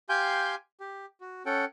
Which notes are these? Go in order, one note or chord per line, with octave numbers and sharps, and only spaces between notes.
G4 F5 G5 G#5 C6 G6
G4
F#4
C#4 A4 F#5 G5